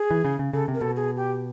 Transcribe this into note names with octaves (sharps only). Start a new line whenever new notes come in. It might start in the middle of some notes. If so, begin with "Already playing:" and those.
Already playing: G#4
E3
C#3
C#3
C#3 A4
C3
A#4
B2 A4
G#4
G4